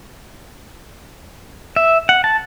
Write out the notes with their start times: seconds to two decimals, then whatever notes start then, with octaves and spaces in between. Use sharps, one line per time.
1.76 E5
2.09 F#5
2.24 A5